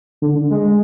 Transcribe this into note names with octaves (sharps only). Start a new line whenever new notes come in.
D3
G#3